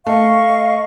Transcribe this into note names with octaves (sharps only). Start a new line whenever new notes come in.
A3 D#5 F5 C#6